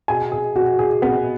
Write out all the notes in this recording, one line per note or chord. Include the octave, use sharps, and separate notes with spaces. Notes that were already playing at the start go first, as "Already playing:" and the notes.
B2 G#4 G#5
G#4
B2 F#4
G#4
B2 B3 B4